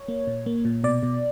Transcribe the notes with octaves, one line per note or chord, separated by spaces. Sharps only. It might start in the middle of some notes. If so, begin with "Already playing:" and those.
Already playing: C#5
A#3
A#2
A#3
A#2
B2 D5
B2